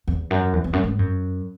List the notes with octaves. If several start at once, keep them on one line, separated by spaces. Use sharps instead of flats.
E2
F#2
E2
E2
F#2
G#2
F#2